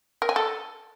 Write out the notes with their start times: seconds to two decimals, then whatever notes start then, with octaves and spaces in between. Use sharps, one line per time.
0.22 A#4
0.29 G#5
0.36 A4